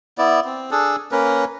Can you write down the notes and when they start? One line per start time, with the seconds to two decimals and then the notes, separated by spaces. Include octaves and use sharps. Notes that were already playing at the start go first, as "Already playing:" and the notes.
0.18 B3 E4 D5
0.45 C4
0.71 D4 G#4 A4
1.12 A#3 C#4 A#4 B4